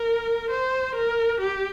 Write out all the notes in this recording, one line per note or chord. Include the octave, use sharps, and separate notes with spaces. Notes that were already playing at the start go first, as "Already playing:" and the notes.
Already playing: A#4
C5
A#4
G4